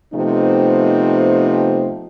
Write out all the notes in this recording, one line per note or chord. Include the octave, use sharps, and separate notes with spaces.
C3 F3 A3 B3 D#4